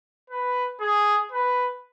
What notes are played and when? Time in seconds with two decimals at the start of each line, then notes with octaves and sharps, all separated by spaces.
0.30 B4
0.80 G#4
1.32 B4